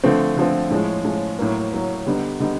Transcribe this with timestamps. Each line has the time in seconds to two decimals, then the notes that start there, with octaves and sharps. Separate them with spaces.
0.04 D3 F3 A3 C4
0.37 D3 F3 A3 C4
0.70 A2 F3 G#3 C#4
1.05 A2 F3 G#3 C#4
1.39 A2 F#3 A#3
1.72 A2 F#3 A#3
2.06 D3 G3 B3 D#4
2.40 D3 G3 B3 D#4